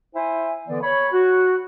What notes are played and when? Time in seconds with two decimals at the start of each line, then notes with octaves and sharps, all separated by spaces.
0.14 E4 C5 E5 G#5
0.67 D3 E3 B3 D5
0.82 C#5 B5
1.12 F#4